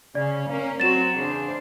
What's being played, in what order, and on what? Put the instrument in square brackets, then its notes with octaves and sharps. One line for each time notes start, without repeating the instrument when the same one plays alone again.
[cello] C#3 [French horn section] C#4 [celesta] D5
[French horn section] A#3 [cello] C#4
[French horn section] F#3 [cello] C4 F#4 [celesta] A6 E7
[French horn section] E2 C#3 [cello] D4 C5